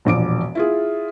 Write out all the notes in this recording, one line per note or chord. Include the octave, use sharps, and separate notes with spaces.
E1 A#1 D6 D7
E4 F4 G#4